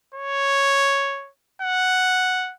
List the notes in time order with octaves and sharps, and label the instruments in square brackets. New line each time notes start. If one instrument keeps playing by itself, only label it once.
[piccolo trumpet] C#5
F#5